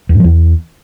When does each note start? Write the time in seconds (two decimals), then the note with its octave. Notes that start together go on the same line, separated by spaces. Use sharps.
0.09 E2
0.14 G#2
0.19 F3
0.24 E2